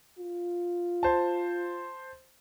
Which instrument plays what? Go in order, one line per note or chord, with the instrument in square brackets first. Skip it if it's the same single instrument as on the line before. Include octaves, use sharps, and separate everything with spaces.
[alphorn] F4
[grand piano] C5 A5